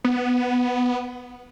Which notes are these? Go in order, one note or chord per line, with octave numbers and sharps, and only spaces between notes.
B3